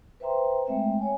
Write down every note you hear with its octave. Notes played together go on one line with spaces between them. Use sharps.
B4 C5 E5 G5 A#5 C6
G#3 A3 C4 E5 G5
C#5 G#5